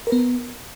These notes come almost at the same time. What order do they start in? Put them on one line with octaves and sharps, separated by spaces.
A#4 B4 B3